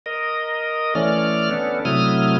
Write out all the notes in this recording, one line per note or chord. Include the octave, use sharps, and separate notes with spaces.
A#4 D#5
E3 A3 C#4 D5 F6
B3 C#4 D4 A4
C3 F#3 A3 E4 D#6 F6